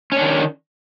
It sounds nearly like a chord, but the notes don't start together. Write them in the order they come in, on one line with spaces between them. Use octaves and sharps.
C#4 D4 D#3